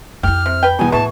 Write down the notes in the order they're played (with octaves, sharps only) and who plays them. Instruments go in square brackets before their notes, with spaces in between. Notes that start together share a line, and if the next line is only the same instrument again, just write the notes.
[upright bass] F2 E4 [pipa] G4 [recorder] F6
[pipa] C3
B4 G5
[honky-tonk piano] E2 B2 [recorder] G#5
[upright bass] A2 [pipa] E3 [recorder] A5 [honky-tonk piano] C#6